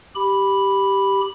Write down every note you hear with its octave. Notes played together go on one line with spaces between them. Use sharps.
G4 B5